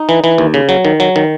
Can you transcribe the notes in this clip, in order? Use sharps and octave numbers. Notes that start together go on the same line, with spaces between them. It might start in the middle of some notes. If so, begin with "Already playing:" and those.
Already playing: D#4
E3
E3
D#2
C#3
F#3
D#3
F#3
D#3